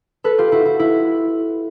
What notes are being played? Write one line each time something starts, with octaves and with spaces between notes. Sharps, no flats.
A4 B4
F4 G4
E4 F#4
E4
E4